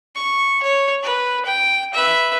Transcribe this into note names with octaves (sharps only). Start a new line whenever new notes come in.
C#6
C#5
B4
G5
B4 E5